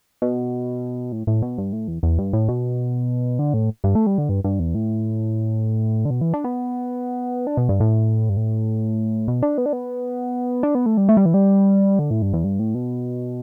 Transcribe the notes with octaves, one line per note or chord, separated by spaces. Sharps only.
B2
A2
A2
B2
G2
A2
E2
E2
G2
A2
B2
D3
A2
G2
A3
G3
D3
G2
G2
E2
A2
D3
B2
E3
D4
B3
D4
B2
G2
A2
G2
A2
B2
D4
B3
D4
B3
D4
B3
A3
G3
A3
G3
E3
G3
D3
A2
G2
E2
G2
A2
B2